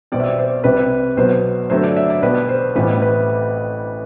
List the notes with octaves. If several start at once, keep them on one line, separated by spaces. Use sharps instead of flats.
B1 B2 G3 C4 D5
E5
D5
C5
C2 C3 G3 C4 B4
B1 B2 F#3 B3 C5
G2 D3 F#3 A3 C4 C5
D5
E5
D5
B1 B2 G3 B3 B4
C5
A1 A2 E3 G3 C4 B4
B4